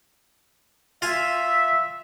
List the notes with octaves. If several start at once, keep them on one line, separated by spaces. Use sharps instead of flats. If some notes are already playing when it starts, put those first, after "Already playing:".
F4 E5 F5 G#5